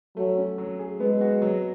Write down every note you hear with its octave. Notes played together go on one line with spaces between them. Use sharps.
F#3 A3
C#4
F#3
G#4
G#3 B3
F#4
F#3